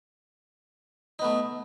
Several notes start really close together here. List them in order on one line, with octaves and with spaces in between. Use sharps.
D#4 B3 A3